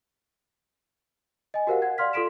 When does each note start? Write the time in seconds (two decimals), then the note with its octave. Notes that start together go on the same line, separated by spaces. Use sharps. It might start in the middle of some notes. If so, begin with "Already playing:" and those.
1.54 D#5 G#5
1.67 F#4 G4 A#4 C5 F5 F#5
1.82 F#5 G#6
1.98 D5 F5 C6 F6 B6
2.13 F4 A4 C6 B6 D7 E7